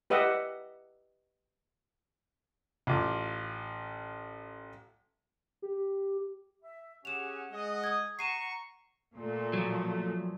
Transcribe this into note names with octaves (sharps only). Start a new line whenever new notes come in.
G4 B4 D#5 E5 F#5
A1 F4 D6
G4
E5
C#4 G4 G#4 F#5 E7 F7
G#3 G#4 D#5 F#5
D#6 G#6
F#5 A#5 C#6 C7 D#7 E7
A#2 A3
F3 F#3